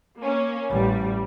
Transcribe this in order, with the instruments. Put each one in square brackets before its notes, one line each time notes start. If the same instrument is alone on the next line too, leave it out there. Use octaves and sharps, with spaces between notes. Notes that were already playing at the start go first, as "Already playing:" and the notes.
[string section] A#3 C#4
[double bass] A1 [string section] G3